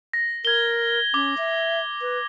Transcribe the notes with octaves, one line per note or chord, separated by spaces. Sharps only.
A#6
A#4 G#6 G7
C#4 D6
E5
B4